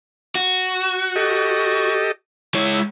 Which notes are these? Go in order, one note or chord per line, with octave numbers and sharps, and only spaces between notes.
F#4
G4 A4 D#5
G#3 E4 C#5